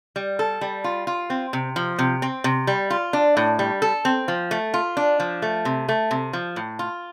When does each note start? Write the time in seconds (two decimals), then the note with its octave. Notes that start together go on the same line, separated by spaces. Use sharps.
0.16 G3
0.39 A4
0.61 G3
0.84 F4
1.07 F4
1.30 C4
1.53 C3
1.76 F3
1.99 C3
2.22 C4
2.44 C3
2.67 G3
2.90 F4
3.13 D4
3.37 A2
3.59 G3
3.82 A4
4.05 C4
4.28 F3
4.51 A3
4.74 F4
4.97 D4
5.20 F3
5.42 A3
5.65 C3
5.89 A3
6.11 C3
6.33 F3
6.56 A2
6.79 F4